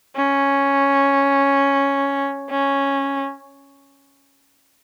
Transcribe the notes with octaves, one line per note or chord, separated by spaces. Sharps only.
C#4
C#4